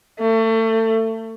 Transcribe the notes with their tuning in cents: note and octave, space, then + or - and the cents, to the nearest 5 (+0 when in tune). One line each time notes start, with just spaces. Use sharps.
A3 +30